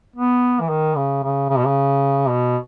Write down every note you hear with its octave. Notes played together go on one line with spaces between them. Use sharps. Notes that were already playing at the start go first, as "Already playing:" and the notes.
B3
E3
D#3
C#3
C#3
C#3
B2
C#3
B2